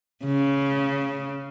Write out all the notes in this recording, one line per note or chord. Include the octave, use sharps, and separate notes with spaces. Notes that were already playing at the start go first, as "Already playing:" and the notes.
C#3